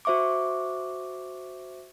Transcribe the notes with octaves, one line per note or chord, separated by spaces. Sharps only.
F#4 C5 E5 C#6 D6